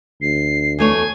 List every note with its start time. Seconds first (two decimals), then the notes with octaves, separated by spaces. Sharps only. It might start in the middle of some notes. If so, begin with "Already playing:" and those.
0.22 D2 C7
0.79 E2 A3 C#5 G#5